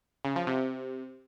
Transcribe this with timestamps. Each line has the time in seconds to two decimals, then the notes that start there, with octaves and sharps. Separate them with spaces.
0.25 C#3
0.36 F3
0.47 C3